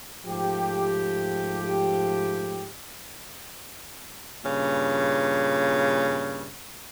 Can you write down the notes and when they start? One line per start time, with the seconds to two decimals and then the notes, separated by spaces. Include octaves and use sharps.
0.26 G#2 F3 A3 G4
4.44 G2 A#2 C#3